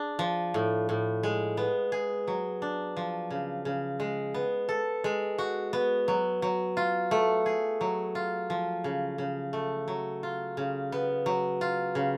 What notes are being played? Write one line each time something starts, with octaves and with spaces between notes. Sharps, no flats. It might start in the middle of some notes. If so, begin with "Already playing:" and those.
Already playing: D4 G#4
F3
A2
A2
G#3
B3
G#4
F#3
D4
F3
C#3
C#3
G#3
B3
A4
G#3
F#4
B3
F#3
F#3
F4
A3
G#4
F#3
F4
F3
C#3
C#3
A3
F#3
F4
C#3
B3
F#3
F4
C#3